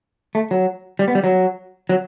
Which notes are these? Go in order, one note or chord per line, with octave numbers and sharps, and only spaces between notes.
A3
F#3
G3
B3
G3
F#3
F#3